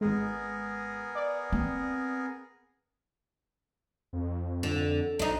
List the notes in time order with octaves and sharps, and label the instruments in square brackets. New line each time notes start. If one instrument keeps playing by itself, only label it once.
[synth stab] G#1 G#3 [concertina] B3 G#4 A#4
[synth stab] D5
[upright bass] C4
[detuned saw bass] F2
[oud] D3
[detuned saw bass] B1 [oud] D4 D#4